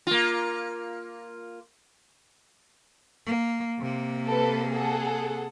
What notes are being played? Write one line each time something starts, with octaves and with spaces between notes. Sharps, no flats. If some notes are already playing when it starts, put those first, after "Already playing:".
A#3 F4
A#3
C3 A#3
A4 B4
G#4 A4 F#5